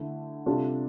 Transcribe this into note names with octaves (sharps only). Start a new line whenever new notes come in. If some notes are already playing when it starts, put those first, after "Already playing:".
Already playing: D3 A3 E4
C3 G3 D4 F4 A4